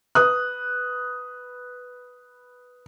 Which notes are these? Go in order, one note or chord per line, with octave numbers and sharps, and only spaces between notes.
B4 D#6 F#6